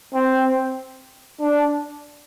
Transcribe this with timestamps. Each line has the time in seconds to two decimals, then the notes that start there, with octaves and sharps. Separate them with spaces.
0.14 C4
1.40 D4